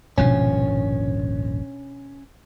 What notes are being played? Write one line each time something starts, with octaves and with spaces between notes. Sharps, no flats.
D#1 G#1 B2 F3 C#4 D4